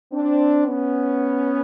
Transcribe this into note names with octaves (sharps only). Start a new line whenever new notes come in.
C4 D4
B3 C#4